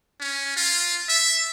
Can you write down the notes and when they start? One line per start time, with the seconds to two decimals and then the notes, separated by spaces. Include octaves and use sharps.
0.20 C#4
0.56 F4
1.09 E5